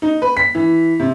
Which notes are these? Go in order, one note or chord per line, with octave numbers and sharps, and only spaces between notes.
D#4
B4
B6
E3
C3